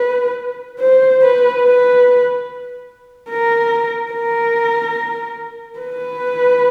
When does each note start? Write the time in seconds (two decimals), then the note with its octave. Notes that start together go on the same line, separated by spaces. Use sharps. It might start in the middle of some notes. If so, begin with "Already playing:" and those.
Already playing: B4
0.80 C5
1.22 B4
1.63 B4
3.30 A#4
4.13 A#4
5.79 B4